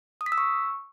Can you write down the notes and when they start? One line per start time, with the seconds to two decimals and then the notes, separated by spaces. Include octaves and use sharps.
0.21 D#6
0.26 B6
0.32 E6
0.38 C#6